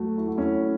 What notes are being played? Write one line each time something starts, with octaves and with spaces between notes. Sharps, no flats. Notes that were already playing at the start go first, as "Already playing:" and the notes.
Already playing: F#3 A3 F#4 A4
E4
F#4
C#4 E4